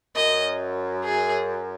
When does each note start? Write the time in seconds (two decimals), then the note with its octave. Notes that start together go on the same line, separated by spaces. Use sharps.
0.16 F#2 D#5
1.05 G#4